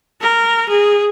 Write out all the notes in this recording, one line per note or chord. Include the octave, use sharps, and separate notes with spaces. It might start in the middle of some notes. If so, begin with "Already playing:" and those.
A#4
G#4